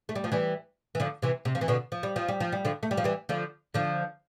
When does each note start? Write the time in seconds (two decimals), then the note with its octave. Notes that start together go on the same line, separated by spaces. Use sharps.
0.09 A3
0.16 G3
0.24 F3
0.32 E3 G3
0.95 E3
1.00 D3 F3
1.22 C3 E3
1.45 C3
1.55 F3
1.61 E3
1.68 B2 D3
1.92 F3
2.03 G3
2.16 F3
2.28 G3
2.40 F3
2.52 G3
2.65 D3 F3
2.83 A3
2.91 G3
2.97 F3
3.04 E3 G3
3.29 D3 F3
3.74 D3 F3